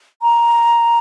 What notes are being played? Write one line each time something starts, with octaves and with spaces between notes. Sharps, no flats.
A#5